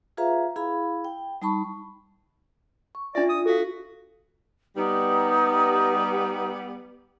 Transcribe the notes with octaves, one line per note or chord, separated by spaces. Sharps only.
F4 G#4 B4 E5 F5 A#5
E4 G#4 F5 B5
G5
G3 D#4 A5 B5 C#6
C#6
D4 F4 D5 E5
D#6
F#4 A4 F5
G3 B3 D#4